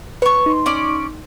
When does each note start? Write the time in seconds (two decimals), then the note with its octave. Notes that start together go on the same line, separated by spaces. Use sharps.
0.22 B4 C#5 C#6
0.46 D#4 C6
0.66 C#4 D5